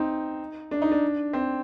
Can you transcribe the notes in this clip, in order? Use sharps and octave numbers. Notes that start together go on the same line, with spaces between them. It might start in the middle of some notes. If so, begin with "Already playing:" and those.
Already playing: C4 D#4
D4
D#4
D4
C4